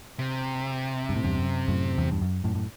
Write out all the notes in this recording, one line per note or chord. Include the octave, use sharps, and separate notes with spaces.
C3
G2
A2
E2 G2
F#2
F#2 A2
E2 G2
G2
F#2
F#2 A2
A2